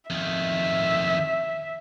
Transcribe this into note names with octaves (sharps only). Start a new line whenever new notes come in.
F2 D#3 E5